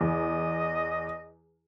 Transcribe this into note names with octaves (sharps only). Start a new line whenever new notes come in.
E2 D#5